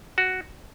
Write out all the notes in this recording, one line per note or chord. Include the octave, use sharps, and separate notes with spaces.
F#4